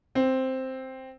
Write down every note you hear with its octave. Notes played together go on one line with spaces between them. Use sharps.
C4